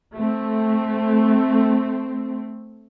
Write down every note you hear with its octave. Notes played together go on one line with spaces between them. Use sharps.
A3 C4